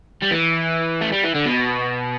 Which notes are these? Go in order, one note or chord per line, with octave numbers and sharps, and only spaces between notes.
G3
E3
A3
G3
E3
D3
B2